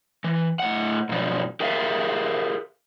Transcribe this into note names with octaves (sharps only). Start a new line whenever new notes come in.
E3
A2 F#5
G2 B2 F3 F#3 D4
G4 G#4 A#4 E5 F5